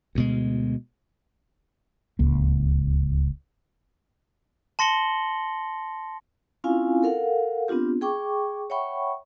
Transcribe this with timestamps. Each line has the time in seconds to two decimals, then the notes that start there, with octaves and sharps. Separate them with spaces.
0.15 D2 B2 G#3
2.19 D1 C#2 A#3
4.79 A5 C6 A#6 C#7 F#7 G7
6.64 C4 C#4 E4 F4 F5 G#5
7.03 A4 A#4 F5 F#5
7.68 B3 C4 D4 F4 G4
8.01 G#4 G5 C#6 D6
8.70 C#5 E5 F#5 G5 B5 C#6